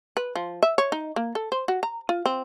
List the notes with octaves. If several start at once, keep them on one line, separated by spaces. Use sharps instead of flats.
B4
F3
E5
C#5
D#4
A#3
A4
C5
F#4
A#5
F4
C4